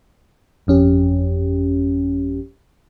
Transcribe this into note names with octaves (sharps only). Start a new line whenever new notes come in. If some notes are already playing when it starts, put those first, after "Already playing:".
G1 F2 C#4 G4